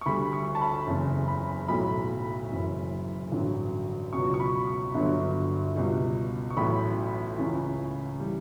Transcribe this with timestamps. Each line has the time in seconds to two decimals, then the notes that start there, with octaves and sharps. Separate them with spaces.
0.01 C#6
0.06 D2 D3 G3 B5
0.33 C#6
0.55 A5
0.61 B5
0.87 F#1 E2 C#3
1.28 B5
1.68 B1 A2 F#3 B5
2.51 F#1 F#2 E3
3.32 A1 G2 D3 F#3
4.13 C#2 B2 F#3 C#6
4.34 C#6
4.40 B5
4.67 C#6
4.94 G1 G2 D3 F#3
5.76 C#2 B2 G3
6.50 C#6
6.57 A1 A2 F#3 B5
7.38 C#2 C#3 E3
8.20 E3 G3